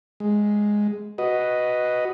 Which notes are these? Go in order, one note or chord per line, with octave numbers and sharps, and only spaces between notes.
G#3
F#4 B4 D#5